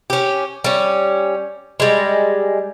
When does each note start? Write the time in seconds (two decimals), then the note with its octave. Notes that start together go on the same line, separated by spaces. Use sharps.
0.10 C#4 G4
0.64 G3 C#4
1.80 G3 G#3